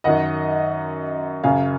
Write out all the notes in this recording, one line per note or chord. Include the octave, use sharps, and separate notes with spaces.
F#2 D#3 D#5 F#5
F#2 C#3 F5 G#5